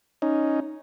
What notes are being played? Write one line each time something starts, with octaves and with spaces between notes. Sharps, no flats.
C#4 D#4